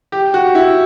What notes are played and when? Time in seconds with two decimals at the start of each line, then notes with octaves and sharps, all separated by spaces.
0.12 G4
0.34 F#4
0.55 E4